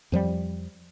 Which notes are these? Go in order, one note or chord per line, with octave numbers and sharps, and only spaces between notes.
F2 F3 G3